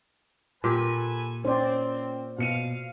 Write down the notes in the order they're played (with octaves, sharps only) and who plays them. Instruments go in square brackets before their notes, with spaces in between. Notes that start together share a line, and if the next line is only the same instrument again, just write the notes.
[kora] A#2 G4 [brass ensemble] A4 B4 G#5
[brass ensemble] C4 [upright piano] C#4 G5 [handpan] C5 D5
[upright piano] B2 C#7 D#7 [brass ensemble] F5